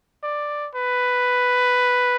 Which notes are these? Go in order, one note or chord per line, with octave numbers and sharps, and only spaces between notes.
D5
B4